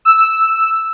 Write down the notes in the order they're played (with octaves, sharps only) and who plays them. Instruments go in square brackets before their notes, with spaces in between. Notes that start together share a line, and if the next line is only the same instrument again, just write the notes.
[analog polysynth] E6